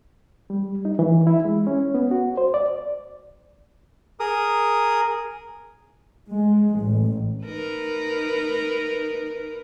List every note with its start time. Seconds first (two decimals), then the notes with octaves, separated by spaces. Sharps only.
0.50 G3
0.85 D#4
0.99 E3
1.27 E4
1.45 G#3
1.67 C#4
1.94 B3
2.11 F#4
2.37 C5
2.54 D5
4.20 G#4 A#4 D#6
6.30 G#3
6.81 A1
7.44 D#4 A#4 B4